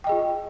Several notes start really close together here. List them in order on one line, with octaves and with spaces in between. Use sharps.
G5 D#5 G#4 F4